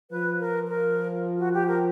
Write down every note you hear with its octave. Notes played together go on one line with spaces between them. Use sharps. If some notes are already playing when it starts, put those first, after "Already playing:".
F3 B4
A#4
A#4
F#4
G4
A#4